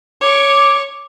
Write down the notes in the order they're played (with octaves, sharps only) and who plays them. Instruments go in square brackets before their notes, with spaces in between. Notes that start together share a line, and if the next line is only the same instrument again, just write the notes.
[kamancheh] C#5 C#6 [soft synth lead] D6